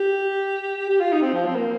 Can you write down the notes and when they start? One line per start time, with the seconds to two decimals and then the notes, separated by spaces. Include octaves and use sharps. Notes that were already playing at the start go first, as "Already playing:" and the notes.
Already playing: G4
0.89 G4
1.00 F4
1.12 D#4
1.22 C4
1.34 F3
1.46 C4
1.55 A#3